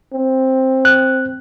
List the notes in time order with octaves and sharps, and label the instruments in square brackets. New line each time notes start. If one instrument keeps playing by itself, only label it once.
[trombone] C4
[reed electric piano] F#6